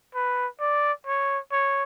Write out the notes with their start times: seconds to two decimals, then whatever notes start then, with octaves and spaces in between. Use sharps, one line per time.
0.15 B4
0.60 D5
1.07 C#5
1.52 C#5